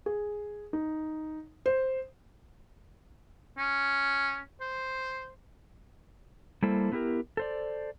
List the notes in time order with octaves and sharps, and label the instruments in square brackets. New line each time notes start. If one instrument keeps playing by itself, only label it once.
[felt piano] G#4
D#4
C5
[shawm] C#4
C5
[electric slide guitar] G3 A#3 E4 A4 C5
A3 B3 E4 G4 A#4
A4 C5 D5